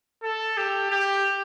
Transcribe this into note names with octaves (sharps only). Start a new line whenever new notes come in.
A4
G4
G4